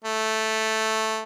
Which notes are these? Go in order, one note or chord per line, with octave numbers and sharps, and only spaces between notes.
A3